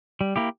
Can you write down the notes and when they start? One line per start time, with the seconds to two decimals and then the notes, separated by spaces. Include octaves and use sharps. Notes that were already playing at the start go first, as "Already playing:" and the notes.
0.21 G3
0.36 A#3 E4 G4